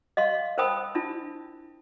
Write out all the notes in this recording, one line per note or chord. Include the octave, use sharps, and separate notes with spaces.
D#5 F5 C6
A#4 C5 G5 A5 B5 D#6
D4 E4 F4 A5